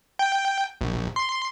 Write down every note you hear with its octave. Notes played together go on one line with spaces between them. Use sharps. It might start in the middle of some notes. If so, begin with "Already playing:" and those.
G5
A#1
C6